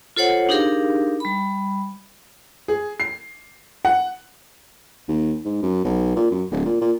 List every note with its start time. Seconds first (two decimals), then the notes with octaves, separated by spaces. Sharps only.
0.16 F4 A4 C5 C#5 F#5
0.49 D4 D#4 G4 G#4 A#4 F5
1.20 G3 B5
2.68 G#4
3.00 C7
3.85 F#5
5.09 D#2
5.45 G#2
5.63 F#2
5.85 B1
6.16 A#2
6.31 F#2
6.51 D1
6.65 A#2
6.81 A#2